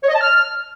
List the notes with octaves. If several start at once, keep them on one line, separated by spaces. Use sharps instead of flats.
C#5
D#5
A5
F6